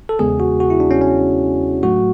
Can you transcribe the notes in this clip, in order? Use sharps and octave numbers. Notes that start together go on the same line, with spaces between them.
A4
E2 C#3 G#3 B3 G#4
F#4
F#4
E4
D4
C#4
C#4
A2 F#3 A3 F#4